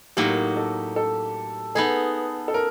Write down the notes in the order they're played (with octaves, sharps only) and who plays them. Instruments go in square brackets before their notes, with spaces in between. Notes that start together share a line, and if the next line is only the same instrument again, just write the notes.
[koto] A2 F#3 A#3 D#4 [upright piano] G4
[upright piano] A4
A4
[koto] B3 D#4 G#4 [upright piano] A4
[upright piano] A4
A#4